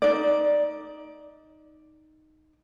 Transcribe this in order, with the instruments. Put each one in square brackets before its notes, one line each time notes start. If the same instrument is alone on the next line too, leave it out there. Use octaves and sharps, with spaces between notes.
[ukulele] D#4 D5